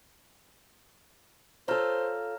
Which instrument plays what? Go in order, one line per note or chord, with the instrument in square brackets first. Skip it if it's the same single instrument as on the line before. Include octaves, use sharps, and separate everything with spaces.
[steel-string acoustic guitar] F4 A4 [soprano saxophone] C5 [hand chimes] C#5 A#5 F6